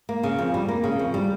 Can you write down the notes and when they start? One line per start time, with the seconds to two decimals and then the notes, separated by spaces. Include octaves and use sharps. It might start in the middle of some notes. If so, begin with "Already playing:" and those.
0.09 A#3
0.23 C#3
0.39 F2
0.54 G3
0.68 A#3
0.84 C#3
0.99 F2
1.14 G3